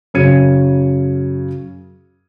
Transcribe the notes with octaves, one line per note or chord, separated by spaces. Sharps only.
F#2 C#3 C#4 G#6 C#7 D#7